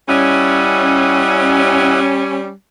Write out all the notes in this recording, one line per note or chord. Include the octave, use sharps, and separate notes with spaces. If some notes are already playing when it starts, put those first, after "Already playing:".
G3 C#4 E4 D#5 F#5